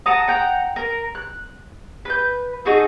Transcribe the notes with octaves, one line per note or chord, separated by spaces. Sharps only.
F#5 A5 A#5 D#6
F#5 G5 A#5
A#4
F#6
B4 G6
D#4 F#4 G#4 A4